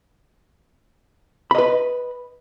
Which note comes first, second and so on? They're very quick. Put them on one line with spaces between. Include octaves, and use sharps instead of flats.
B5 D#5 B4